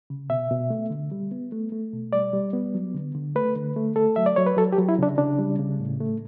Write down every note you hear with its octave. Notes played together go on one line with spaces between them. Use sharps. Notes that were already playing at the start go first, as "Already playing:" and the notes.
C#3
B2 E5
B2
A3
D3
G3
B3
A3
A3
B2
G3 D5
G3
B3
F#3
D3
D3
A3 B4
D3
A3
A3 A4
F#3 E5
D5
F#3 C#5
B4
F#3 A4
G4
F#3
E4
C#3 D4
C#3 D4
G3
C#3
A2
A3